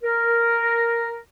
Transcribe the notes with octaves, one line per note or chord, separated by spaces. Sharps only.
A#4